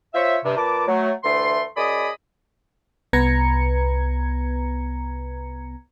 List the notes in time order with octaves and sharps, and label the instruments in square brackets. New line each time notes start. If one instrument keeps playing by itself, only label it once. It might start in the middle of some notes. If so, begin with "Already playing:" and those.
[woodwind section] F4 C5 C#5 E5
G2 C3
A#2 B4 A5 D6
F#3 A3
D2 E3 A3 C6
F#2 G#4 D5 D#5 B5 D#6
[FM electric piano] C2 B3 B4 A#5 G#6 C#7